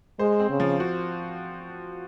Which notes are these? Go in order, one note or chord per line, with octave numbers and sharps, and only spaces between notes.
G#3 C5
C4
C#3
F3
F#4